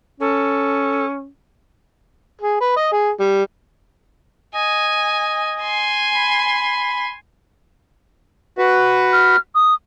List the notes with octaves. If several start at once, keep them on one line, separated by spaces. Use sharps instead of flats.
C#4 A4
G#4
B4
D#5
G#4
G3
D#5 G#5
G#5 C6
B5
F#4 B4
F6
D#6